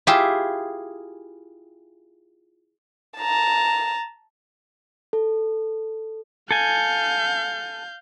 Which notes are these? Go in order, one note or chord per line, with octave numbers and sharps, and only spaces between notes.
E4 F4 G4 G#4 E5
A5 A#5
A4
A4 F5 G#5 G6